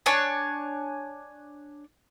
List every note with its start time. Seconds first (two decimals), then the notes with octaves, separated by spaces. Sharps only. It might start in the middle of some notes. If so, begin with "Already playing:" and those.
0.06 D4 C#5 G#5 A5